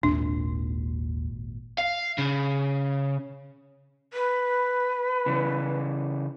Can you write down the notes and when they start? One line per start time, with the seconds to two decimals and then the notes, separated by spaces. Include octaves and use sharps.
0.03 G#1 D#2 A#2 D4
1.78 F5
2.19 C#3
4.13 B4
5.26 C#3 E3